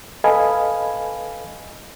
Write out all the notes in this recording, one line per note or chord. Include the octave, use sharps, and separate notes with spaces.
A4 B4 D#5 F5 G#5 B5